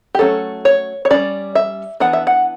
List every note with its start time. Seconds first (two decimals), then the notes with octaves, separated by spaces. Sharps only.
0.15 G4
0.19 F#3 A3 C#4 A4
0.65 C#5
1.05 C#5
1.10 G3 C#4 D5
1.55 E5
2.00 E3 B3 D4 F#5
2.13 E5
2.27 F#5